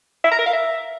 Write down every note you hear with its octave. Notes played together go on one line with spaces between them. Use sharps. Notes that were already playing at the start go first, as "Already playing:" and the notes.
E5
A#5
A#4
F5
E5